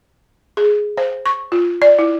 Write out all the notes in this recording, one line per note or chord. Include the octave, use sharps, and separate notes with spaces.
G#4
C5
C#6
F4
D5
E4